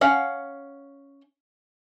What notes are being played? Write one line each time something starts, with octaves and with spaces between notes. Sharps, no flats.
C#4 F5 F#5